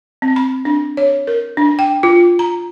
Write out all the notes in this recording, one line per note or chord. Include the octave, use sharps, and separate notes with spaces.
C4
B5
D4
C#5
A#4
D4
G5
F4
A#5